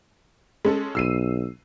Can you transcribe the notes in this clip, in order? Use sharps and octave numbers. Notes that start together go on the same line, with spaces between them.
G#3 C#4 A4
B1 E6 C7 D#7